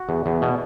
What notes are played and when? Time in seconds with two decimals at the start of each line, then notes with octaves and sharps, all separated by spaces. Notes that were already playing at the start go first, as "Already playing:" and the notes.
Already playing: F#4
0.09 E2
0.26 E2
0.42 B2